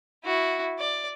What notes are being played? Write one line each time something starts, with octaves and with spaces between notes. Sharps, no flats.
E4 F#4
D5